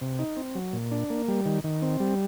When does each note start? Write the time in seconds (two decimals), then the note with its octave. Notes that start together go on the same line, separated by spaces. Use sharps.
0.01 C3
0.19 D#4
0.37 C4
0.55 F#3
0.73 A#2
0.91 D4
1.10 A#3
1.28 G3
1.46 D#3
1.64 D#3
1.82 C4
2.00 G3